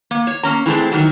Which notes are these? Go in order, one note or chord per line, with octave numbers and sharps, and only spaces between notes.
A#3
C#5
A#3 C#4 A#5
E3 F#3 G#3 A3 C4
D#3 E3 F#3